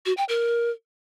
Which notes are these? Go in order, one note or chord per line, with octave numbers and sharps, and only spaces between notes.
F#4
G5
A#4